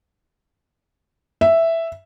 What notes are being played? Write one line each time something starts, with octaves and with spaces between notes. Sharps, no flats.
E5